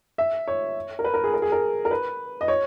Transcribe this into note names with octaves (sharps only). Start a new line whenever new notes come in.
E5
C#5
A#4
B4
A#4
G#4
A#4
G#4
A#4
A#4
B4
D#5
C#5